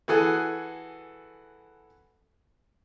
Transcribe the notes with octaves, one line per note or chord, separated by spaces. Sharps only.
E3 F#4 G#4 A4 F#5 G#5